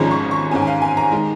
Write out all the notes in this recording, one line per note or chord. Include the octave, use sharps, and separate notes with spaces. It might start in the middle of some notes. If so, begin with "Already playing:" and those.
Already playing: G#1 G#2 F3 G#3 C#4 A#5
C#6
C#6
G#2 D#3 C#4 G#5
G#5
F5
G#5
A#5
D#3 G#3